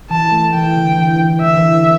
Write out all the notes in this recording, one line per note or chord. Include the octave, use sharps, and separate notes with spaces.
E3 A5
A3
E3 G5
D3
E3
E3
D3 E5
E3
D3